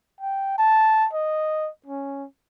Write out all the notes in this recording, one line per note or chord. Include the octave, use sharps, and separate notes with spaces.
G5
A5
D#5
C#4